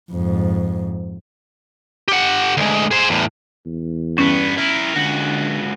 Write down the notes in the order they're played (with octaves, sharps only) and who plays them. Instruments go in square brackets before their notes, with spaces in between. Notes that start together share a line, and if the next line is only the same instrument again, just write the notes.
[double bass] F2 G#2
[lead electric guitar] G4 F#5
D2 G#3
G#4 C5
E2 A2
[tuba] E2
[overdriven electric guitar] G2 B3 [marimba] C#4
[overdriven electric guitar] E4 A#4
[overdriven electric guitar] C#2 F#4 [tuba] D3